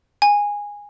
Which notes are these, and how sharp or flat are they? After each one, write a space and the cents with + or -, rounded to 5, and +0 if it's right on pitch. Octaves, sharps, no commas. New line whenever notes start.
G#5 -15